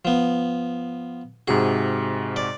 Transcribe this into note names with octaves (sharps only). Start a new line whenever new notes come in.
F3 B3
G#2 C3 F#4 G#4
D5